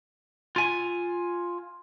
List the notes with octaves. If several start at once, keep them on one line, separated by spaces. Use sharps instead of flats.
F4 G#5